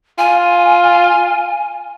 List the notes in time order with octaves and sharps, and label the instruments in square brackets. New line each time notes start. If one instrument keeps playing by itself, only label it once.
[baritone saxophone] F4 [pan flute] G#5